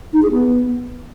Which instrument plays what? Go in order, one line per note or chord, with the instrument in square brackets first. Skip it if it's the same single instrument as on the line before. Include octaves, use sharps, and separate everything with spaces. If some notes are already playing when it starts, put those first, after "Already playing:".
[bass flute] D#4
G#4
B3